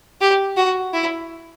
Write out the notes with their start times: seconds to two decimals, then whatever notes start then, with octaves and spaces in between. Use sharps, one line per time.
0.21 G4
0.57 F#4
0.93 E4